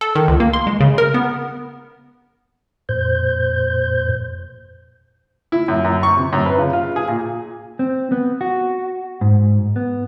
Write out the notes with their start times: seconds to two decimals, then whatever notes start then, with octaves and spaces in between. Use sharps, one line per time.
0.01 A4
0.15 D#3
0.28 C#2
0.40 A#3
0.53 C6
0.67 G#3
0.80 C#3
0.98 A#4
1.14 B3
2.89 F2 A#2 C5 G6
5.52 E4
5.68 F#2
5.85 F#2
6.03 C#6
6.17 C3
6.33 F#2
6.46 B4
6.59 C#3
6.73 F4
6.96 G#4
7.08 A#2
7.79 C4
8.12 B3
8.41 F#4
9.21 G#2
9.76 B3